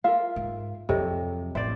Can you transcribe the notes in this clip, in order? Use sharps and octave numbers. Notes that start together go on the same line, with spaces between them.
F4 A#4 E5 F5
G#2
F2 C3 F#3 A4 C#5 D#5
A1 C5 D5 E5